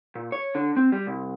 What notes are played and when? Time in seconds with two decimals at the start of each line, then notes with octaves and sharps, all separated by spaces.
0.15 A#2
0.32 C#5
0.55 D3
0.76 C4
0.92 G3
1.07 C2